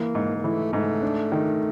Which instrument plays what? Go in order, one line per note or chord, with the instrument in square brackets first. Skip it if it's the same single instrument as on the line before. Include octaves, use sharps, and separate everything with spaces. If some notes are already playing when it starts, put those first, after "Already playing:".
Already playing: [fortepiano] E3 [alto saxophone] A#3
[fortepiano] G#2
[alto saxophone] A#3
[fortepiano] E3 [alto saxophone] A3
[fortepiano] G#2 [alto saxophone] A3
[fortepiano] D4
D#3